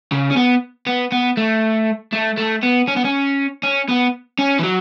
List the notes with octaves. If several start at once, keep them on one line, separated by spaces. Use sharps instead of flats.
C#3
C#4
B3
B3
B3
A3
A3
A3
B3
C#4
B3
C#4
C#4
B3
C#4
E3
F#3